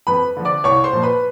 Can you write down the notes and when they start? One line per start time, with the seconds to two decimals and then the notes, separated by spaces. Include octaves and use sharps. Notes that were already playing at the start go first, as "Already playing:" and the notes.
0.07 F2 B4 B5
0.37 D3 F3
0.45 D5 D6
0.64 C2 C#5 C#6
0.84 C5 C6
0.93 A#2 F3
1.03 B4 B5